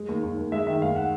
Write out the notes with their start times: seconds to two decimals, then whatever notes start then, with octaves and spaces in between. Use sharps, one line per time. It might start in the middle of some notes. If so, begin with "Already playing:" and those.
Already playing: G#3
0.09 D#2
0.23 D#2
0.38 D#2
0.52 G#3 E5
0.67 D#3 E5
0.81 D#2 F5
0.96 F#5